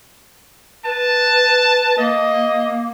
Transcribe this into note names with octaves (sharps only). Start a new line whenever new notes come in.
B4 A5
A#3 D#5